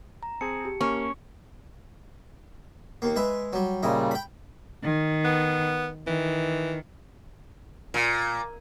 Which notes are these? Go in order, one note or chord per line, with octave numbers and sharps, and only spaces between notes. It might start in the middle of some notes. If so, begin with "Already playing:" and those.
A#5
C4 G#4 A5 C#7
G4
A#3 C#4 C#6 C#7
D#2 A#3
G#3 B4 E5
F#3 G3
A#2 C#3 G3 E4 D#5
G5 B5
D#3
B3
D#3 E3
A#2